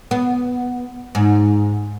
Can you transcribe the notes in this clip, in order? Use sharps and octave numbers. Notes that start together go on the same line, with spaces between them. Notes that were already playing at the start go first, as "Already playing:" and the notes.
B3
G#2